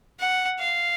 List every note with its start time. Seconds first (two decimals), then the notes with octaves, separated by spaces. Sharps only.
0.19 F#5
0.59 F5